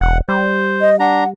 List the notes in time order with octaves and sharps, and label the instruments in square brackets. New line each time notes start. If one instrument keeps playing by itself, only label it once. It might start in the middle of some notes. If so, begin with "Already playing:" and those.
[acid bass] E1 [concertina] F#5
[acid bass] G3 [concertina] C5
[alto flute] D#5
[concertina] D4 A#5 [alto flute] F#5